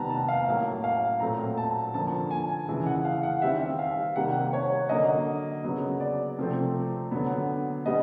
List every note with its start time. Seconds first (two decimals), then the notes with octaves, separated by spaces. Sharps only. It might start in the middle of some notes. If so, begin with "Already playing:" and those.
Already playing: C3 D#3 G3 B3 A5 A#5
0.10 A5
0.28 F5
0.46 A2 F#3 A#3
0.84 F5
1.20 A#2 F#3 A3 C4 A#5
1.57 A5
1.94 D3 F3 A#3 A5
2.31 G#5
2.68 C#3 E3 G#3
2.86 F#5
3.05 F5
3.23 F#5
3.42 D#3 G3 C4 E5
3.79 F5
4.16 C3 D#3 G3 A#3 F#5
4.53 C#5
4.89 D3 F#3 A#3 D#5
5.64 C#3 F#3 B3
6.00 D5
6.38 C3 F3 A3 C4
7.11 D3 F#3 B3
7.86 B2 G3 B3 D#5